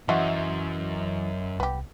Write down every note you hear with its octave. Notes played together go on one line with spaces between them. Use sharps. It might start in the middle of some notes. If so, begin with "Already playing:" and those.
F#2 E3 F#4 D#5 E5 F#5 C6
C2 B3 G4